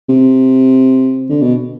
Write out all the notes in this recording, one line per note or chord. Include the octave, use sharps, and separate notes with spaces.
C3
D3
B2